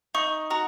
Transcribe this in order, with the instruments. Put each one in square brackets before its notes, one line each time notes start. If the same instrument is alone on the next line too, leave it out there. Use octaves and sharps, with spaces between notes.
[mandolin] D#4 [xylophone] C#6
[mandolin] F#4 [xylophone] A#5